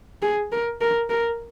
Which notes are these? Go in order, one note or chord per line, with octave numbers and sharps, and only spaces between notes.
G#4
A#4
A#4
A#4